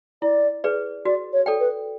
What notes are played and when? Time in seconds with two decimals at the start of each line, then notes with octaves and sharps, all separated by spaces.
0.22 E4 D5
0.64 G#4 B4 D5
1.05 F#4 D5
1.33 C#5
1.46 A4 D5 G5
1.60 B4